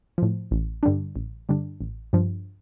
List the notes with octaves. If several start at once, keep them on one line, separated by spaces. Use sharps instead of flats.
A2 F3
A1
G2 D3 G3 D4
A1
G2 D3 G3 D4
A1
G2 F3